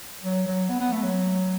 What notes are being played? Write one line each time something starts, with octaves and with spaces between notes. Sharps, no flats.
F#3
F#3
B3
B3
A3
F#3